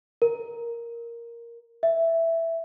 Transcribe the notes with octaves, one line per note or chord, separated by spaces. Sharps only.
A#4
E5